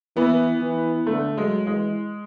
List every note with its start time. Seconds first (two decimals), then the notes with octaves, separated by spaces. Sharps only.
0.16 E3 B3
0.61 E3
1.06 D3 A3
1.37 F#3 G#3
1.67 E3 G#3